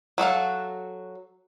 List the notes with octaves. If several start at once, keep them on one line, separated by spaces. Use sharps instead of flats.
F#3 F#4 A4 F5